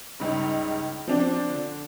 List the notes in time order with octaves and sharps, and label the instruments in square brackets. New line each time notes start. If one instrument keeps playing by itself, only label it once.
[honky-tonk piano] C#2 G2 [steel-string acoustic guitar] C#4 D#4 G#4
[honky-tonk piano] F3 D4 [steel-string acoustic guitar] C4
[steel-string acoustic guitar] D3